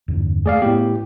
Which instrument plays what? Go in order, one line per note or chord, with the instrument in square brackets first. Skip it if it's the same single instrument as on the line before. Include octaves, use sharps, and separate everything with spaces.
[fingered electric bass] E2 G2 D3
[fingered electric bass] A3 [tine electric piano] G#4 D5 F5
[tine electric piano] A2 G4 [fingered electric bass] B3